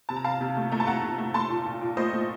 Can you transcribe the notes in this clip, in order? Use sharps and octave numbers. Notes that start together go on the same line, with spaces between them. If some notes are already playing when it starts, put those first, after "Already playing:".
C3 A5
A#5
C3 F5 A5
C3
A3
A3 A#5
A5
A3 F#5 A#5
C3
A3
A3 A5 C6
A#2
A#2
A#2
A3 C5 D#5
A3